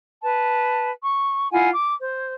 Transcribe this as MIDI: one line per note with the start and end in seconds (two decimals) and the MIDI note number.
0.23 0.90 71
0.23 0.90 81
1.03 1.50 85
1.52 1.69 64
1.52 1.69 65
1.52 1.69 78
1.52 1.69 80
1.73 1.94 86
2.00 2.33 72